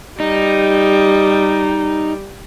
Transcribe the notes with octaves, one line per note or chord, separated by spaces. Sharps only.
G3 D#4